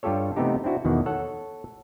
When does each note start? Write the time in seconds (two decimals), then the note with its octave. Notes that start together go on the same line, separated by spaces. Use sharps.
0.03 G2 G3 F4 G4 A4 C#5
0.36 C3 E3 A3 B3 D#4 G4
0.64 C4 D4 E4 F#4
0.85 E2 B2 D#3 F#5
1.06 A4 C#5 F#5